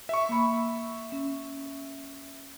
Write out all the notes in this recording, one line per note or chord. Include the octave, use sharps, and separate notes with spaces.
E5 C#6
A#3 B5
C#4